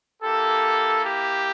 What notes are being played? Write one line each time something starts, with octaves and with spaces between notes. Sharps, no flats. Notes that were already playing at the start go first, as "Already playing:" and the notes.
A#3 E4 G4 A4
G4